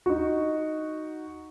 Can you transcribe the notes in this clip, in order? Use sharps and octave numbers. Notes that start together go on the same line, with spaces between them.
D#4 F#4